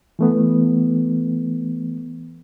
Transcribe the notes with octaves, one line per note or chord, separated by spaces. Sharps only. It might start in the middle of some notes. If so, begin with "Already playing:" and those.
E3 A3 B3